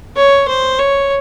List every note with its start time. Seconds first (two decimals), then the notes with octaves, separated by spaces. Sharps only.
0.16 C#5
0.48 C5
0.79 C#5